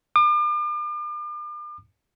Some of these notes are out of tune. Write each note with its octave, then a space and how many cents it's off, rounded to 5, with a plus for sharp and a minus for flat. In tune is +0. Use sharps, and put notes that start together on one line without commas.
D6 +40